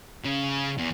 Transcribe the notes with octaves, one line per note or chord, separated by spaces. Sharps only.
C#3
E2